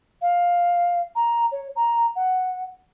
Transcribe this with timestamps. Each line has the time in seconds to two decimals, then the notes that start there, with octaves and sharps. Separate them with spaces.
0.22 F5
1.16 A#5
1.52 C#5
1.76 A#5
2.16 F#5